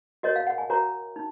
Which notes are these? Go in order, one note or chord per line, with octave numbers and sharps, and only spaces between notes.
F#4 A#4 C#5 D#5
F5
F#5
G#5
F#4 A#4 C#5 A#5
D#4